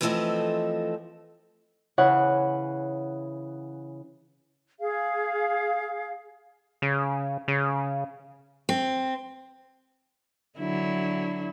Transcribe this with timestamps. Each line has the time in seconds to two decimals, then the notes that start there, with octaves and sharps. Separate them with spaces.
0.01 E3 F3 A3 C4 A4 D#5
1.98 C#3 E3 C#5 F#5
4.80 G#4 F5
6.82 C#3
7.48 C#3
8.69 C4
10.58 D3 F#3 E4